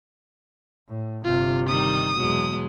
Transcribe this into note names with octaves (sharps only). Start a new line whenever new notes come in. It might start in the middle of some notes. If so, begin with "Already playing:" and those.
A2
G1 C3 F4
D#3 G3 D#4 D#6
E2 B2 F#3 G#3